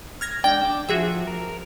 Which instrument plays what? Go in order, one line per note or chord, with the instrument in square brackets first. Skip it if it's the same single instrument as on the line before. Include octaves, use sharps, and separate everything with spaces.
[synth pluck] F6 G#6 A#6
[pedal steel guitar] G#3 D4 D5 [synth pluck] G5
[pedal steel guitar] D4 D6
[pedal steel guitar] F3 [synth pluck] F#4 G#4 E5
[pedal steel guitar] A#4